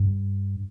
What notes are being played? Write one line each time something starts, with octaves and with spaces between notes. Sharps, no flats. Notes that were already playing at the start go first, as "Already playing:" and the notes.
Already playing: G2